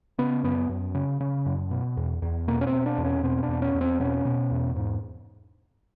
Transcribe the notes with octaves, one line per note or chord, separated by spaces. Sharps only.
C#3 B3
F#2 B3
F#2
C#3
C#3
F#2
B2
E2
E2
B2 A#3
C#4
C4
B2
D4
E2
C#4
B2 C4
D4
E2
C#4
E2
C4
B2 C#4
B2
E2
G#2